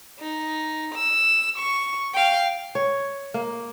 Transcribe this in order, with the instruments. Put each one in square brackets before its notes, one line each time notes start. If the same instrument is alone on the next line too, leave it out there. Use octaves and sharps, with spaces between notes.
[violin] D#4
E6
C#6
F5 G5
[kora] C#5
A#3